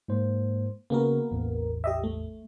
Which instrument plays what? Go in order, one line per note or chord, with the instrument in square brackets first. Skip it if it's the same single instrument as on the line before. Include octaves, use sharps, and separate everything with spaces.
[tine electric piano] G#2 A#3 C5
[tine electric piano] C#3 F#4 [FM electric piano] A#3 B3 A#4
[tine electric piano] A1 E2
[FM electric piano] G4 D#5 E5
A3